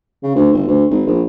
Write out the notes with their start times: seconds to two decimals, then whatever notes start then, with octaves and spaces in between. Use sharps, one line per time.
0.23 C#3
0.35 D2
0.53 G1
0.67 D2
0.90 G#1
1.06 A#1